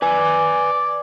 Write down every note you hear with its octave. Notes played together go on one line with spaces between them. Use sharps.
B4 D5 G#5